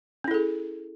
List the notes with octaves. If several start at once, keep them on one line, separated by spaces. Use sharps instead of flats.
C#4 E4 G#4 A4